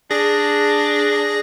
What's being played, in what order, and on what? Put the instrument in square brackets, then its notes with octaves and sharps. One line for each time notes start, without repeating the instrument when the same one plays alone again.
[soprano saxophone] D4 [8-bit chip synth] G#4 A#6